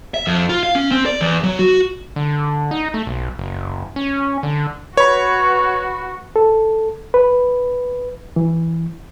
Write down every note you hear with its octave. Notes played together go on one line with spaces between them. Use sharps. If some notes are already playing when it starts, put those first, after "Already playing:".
E5
F2
F4
F5
C#4
C4
D5
E2
F#3
F#4
D3
D#4
A3
B1
F#1
C#4
D3
F#4 B4 C#5 B5
A4
B4
E3